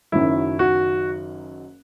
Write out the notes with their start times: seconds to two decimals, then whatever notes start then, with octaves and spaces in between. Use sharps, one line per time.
0.12 F#1 F#2 D#3 F#3 C#4 E4
0.59 F#4